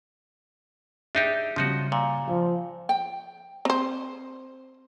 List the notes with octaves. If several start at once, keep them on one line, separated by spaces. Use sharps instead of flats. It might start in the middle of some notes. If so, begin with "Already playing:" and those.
D4 D#4 G4 G#4 E5
C#3 F3 G3 D#4 F#4
A#2
F3 F5
G5
C4 C5